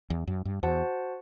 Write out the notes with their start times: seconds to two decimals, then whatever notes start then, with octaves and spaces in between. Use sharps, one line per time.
0.10 E2
0.27 F#2
0.45 G2
0.63 E2 F#4 C5 F#5 A5